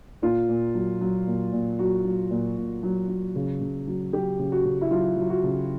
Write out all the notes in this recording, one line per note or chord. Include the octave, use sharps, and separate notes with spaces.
A#2 F4
A#2
F#3
F#3
A#2
A#2
F#3 F#4
F#3
A#2
A#2
F#3
F#3
C#3
C#3
F#3
F#3 G4
C#3
F#4
C#3
E4
F#3 F4
F#3
F#4
C#3